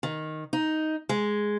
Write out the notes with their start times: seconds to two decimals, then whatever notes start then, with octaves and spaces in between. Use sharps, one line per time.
0.03 D#3
0.53 D#4
1.09 G#3